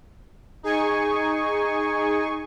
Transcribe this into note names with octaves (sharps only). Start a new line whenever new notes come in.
D#4 G#4 G#5 C#6